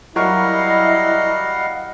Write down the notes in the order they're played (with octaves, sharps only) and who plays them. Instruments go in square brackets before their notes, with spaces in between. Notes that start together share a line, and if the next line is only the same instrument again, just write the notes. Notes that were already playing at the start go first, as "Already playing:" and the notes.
[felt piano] F#3 A#4 C#6 [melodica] G3 F5 F#5 [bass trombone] E4 [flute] D#5